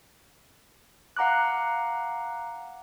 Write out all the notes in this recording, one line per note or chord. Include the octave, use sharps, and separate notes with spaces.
F5 F#5 A#5 D6 F#6